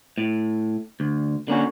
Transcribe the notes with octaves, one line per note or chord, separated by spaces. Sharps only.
A2
D2
D3 A#3 C#4 F#4